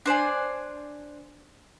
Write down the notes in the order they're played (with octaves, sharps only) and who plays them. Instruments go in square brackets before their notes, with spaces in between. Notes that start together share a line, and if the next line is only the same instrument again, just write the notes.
[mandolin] D4 C5 D5 G#5